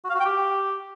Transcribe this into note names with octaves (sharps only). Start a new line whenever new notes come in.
F#4
F5
F#4
G5
G4